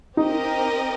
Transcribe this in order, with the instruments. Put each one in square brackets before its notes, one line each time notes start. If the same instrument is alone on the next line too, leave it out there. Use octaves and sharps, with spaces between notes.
[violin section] C4 G4 A#4 D#5 [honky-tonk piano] D#4